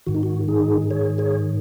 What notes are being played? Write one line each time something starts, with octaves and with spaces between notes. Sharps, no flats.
G#2 D#3 F#4
D#4
F#4
D#4 G#4
G#4 C#5
G#4 C#5